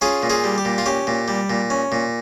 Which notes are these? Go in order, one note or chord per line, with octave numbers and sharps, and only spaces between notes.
C#4 F4 G#4
A#2
F4 G#4
G3
G4
A#2
F4
C#4 G4
A#2
G3
A#2
C#4
A#2